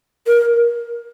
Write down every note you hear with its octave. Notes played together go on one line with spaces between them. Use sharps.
A#4